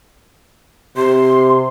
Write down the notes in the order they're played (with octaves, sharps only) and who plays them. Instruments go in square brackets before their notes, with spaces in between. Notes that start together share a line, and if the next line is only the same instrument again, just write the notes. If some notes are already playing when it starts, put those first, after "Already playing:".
[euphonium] C3 [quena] C6